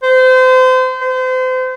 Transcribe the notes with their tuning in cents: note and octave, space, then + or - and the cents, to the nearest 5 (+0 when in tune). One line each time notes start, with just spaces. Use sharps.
C5 -30
C5 -35